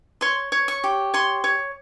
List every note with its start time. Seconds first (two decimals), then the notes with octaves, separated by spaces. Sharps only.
0.21 C#5 C6
0.52 C#5
0.68 C#6
0.84 G4
1.14 C#5 C6
1.44 C#5